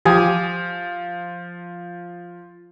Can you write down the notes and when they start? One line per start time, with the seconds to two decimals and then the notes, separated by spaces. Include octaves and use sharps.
0.05 F3 G4 G#5 D#6